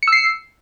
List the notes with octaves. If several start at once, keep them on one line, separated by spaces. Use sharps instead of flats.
E6 C7 C#7